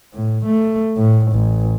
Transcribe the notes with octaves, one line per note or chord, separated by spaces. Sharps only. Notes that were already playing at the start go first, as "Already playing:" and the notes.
A2
A3
A2
A1